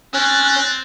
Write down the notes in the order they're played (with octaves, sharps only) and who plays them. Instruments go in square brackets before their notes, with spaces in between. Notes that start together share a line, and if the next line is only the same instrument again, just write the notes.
[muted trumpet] C4 [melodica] C#4 [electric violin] F#6 A6